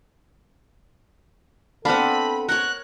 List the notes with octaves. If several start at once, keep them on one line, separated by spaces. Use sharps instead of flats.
B3 C4 D4 A4 F5 B5
A#4 C#5 F#6